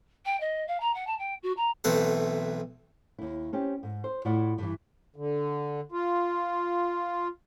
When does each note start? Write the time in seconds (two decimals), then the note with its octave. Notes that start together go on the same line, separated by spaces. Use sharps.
0.25 G5
0.40 D#5
0.67 F5
0.80 A#5
0.94 F#5
1.06 A5
1.18 G5
1.42 F#4
1.56 A#5
1.84 B1 E3 A3 C4 A4 F#5
3.18 D#2 E4
3.53 C4 C#4 G4
3.83 G#2
4.04 C5
4.25 A2 E4 F4 D5 F#5
4.58 G2 E3
5.16 D3
5.92 F4